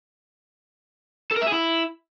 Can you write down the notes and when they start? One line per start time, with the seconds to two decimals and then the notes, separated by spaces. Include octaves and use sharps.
1.31 A4
1.36 A#4
1.41 E5
1.46 G#4
1.52 E4